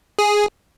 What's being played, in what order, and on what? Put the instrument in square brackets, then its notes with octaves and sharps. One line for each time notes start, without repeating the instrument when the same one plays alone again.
[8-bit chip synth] G#4